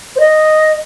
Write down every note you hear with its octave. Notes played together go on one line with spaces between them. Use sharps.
C5
D#5